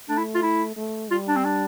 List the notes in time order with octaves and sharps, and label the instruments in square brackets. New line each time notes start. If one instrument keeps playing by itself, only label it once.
[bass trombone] A3 [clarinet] D4
[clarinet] E4
F4
E4
[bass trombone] A3
[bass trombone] G3 [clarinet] F4
[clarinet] D4
C4
D4